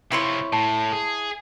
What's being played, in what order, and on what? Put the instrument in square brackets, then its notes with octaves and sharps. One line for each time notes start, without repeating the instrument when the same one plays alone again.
[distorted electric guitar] C3 F4 [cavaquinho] E4 C#5 C6
[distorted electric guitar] A2 [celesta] A5
[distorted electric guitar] G#4